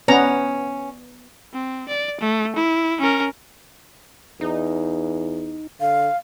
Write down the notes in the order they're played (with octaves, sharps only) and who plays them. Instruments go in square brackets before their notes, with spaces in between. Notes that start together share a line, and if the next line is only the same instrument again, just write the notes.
[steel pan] B3 A#5 [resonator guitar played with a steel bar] C#4
[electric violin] C4
D5
A3
E4
C#4 A#4
[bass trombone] E2 [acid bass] D#4
[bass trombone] D3 [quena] F5